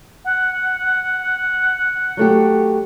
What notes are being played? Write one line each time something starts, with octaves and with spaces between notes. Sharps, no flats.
F#5
F#3 A3 G4